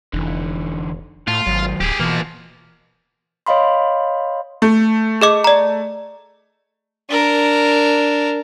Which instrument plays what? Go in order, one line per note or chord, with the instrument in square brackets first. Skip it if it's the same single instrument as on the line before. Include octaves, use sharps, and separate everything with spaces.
[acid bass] F1 [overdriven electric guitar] D3 E3
[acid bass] A2 [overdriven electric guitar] A3 A5 [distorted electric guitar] F4
[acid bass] G#1 [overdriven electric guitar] D#3 F#3
[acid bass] D1 [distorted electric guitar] G4 G#4
[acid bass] B2 [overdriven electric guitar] E3 [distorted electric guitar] F3 A#3
[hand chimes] C#5 D#5 F5 B5 C6
[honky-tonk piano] A3
[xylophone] G#4 D#5 D6
D5 A#5
[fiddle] D4 A#4